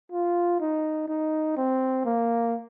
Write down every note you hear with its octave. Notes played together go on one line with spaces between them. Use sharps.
F4
D#4
D#4
C4
A#3